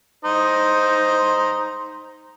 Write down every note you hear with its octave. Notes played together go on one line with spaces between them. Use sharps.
D#4 C5 D#5